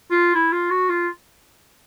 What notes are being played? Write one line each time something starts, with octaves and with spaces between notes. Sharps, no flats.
F4
E4
F4
F#4
F4